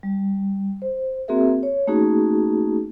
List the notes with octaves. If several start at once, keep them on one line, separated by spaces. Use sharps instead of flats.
G3
C5
A#3 C4 F#4 G#4 A#4 E5
C#5
A3 A#3 C#4 D#4 F#4 G#4